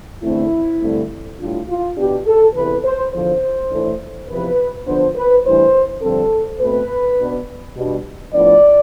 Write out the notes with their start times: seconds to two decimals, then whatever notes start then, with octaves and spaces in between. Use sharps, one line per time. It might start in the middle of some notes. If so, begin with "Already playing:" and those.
0.23 E2 D3 A3 C4 E4
0.82 G2 D3 A3 C4
1.39 A2 G3 D4 F4
1.69 F4
1.97 B2 B3 D4 G4
2.26 A4
2.55 E2 C3 E3 B4
2.84 C5
3.13 E2 D3 F3 C5
3.71 A2 E3 A3 D4
4.29 E2 C3 F3 B4
4.87 D3 F3 B3 D4 C5
5.16 B4
5.45 A2 E3 G3 D4 C5
6.03 G2 D3 F3 C4 A4
6.61 B2 A3 C4 B4
7.18 B2 B3 D4
7.76 B2 G3 D4
8.34 A2 F3 B3 D4 D5